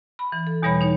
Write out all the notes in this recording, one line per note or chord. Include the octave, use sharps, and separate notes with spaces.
B5
E3
A4
E2 B2 E3 G3 C#5 B5
D#4 C#5